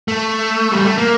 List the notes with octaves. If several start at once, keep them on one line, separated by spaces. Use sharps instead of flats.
A3
G3
A3
A#3